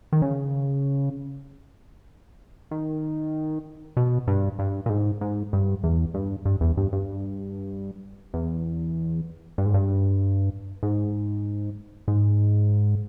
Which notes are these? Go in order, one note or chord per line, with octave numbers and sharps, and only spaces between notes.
D#3
C#3
D#3
B2
G2
G2
A#2
G#2
G#2
G2
E2
G2
G2
E2
G2
G2
E2
G2
G#2
G2
G#2
G#2